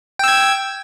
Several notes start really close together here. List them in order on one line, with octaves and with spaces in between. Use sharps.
G5 E6 G#6